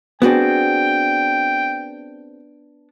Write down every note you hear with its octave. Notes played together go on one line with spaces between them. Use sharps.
B3 C4 D4 F#4 G#4 G5